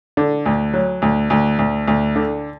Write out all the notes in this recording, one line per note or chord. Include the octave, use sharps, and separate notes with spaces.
D3
D2
F#3
D2
D2
D2
D2
D3